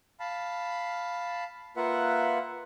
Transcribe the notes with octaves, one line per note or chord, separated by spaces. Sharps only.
F5 A5 B5
A#3 F4 B4 E5 F#5